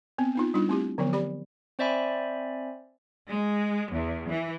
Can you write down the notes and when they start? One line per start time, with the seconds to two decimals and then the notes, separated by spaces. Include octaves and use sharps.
0.18 B3 C4
0.35 B3 D#4 F4
0.54 G3 D4 D#4 F4
0.68 A3 C4 E4 G4
0.98 D3 F3 F#3 B3
1.13 G4 D5 B5
1.79 C4 C5 D5 E5 G#5 B5
3.30 G#3
3.90 E2
4.28 E3